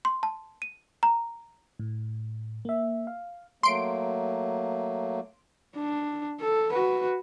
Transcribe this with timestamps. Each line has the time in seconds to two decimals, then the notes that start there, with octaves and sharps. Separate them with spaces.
0.05 C6
0.23 A5
0.62 D#7
1.03 A#5
1.79 A2
2.65 A#3 E5
3.07 F5
3.63 F#3 A3 A#3 C6 D7
5.75 D4
6.40 A4
6.72 F#4 B4